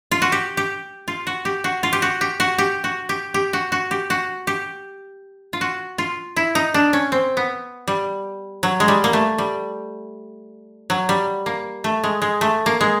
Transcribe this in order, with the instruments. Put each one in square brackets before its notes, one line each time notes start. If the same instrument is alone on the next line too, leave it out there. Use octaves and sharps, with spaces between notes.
[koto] F4
F#4
G4
G4
F4
F#4
G4
F#4
F4
G4
F#4
G4
F#4
G4
F#4
G4
G4
F#4
F#4
G4
F#4
G4
F4
F#4
F4
E4
D#4
D4
C#4
C4
B3
G3
F#3
G#3
G3
A#3
A3
G3
F#3
G3
A#3
A3
G#3
G#3
A3
A#3
G#3